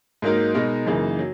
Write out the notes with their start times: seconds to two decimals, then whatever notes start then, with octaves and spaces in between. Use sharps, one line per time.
0.22 G#2 F#3 A#3 D#4 A#4
0.54 B2 G#3 D#4 A#4
0.87 F#2 C#3 E3 A#3 D#4
1.19 F#3